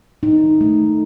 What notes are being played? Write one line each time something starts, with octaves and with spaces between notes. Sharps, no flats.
D#4
A3